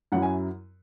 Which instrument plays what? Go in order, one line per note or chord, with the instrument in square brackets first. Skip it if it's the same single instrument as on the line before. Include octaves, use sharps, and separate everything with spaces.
[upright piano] F#2 F#3 E4 F#5
G#5